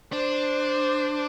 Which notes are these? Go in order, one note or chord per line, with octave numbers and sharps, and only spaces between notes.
D4 C5